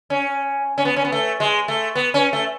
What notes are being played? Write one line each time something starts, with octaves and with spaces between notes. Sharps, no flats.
C#4
C#4
B3
C#4
B3
A3
G#3
A3
B3
C#4
A3